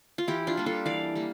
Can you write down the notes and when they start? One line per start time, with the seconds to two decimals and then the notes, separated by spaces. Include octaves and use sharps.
0.18 F4
0.28 E3 E4 G4
0.47 D4 F4
0.57 G3 A#3
0.66 F4 A4
0.85 E3 D5 F5
1.15 G3 A#3